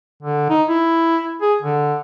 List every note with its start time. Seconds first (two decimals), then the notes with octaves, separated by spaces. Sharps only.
0.23 D3
0.50 D#4
0.69 E4
1.42 G#4
1.62 D3